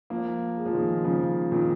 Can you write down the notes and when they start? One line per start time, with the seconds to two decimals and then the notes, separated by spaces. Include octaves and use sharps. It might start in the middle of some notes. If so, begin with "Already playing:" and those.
0.10 F3 A#3
0.57 G#3
0.66 F3
0.74 D#3 G#3
1.04 C#3 F3
1.52 A#2 D#3